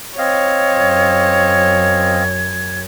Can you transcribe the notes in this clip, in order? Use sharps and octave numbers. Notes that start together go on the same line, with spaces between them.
C4 C#5 D#5 F5 G#6
F#2